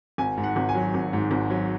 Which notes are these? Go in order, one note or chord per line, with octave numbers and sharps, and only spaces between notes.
G#1 G#5
G#2
F#5
G#1
G#5
F#3
G#1
G#2
G#1
F#3